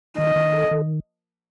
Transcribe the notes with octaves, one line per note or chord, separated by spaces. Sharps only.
D#3 D#5
D#3
A4
D#3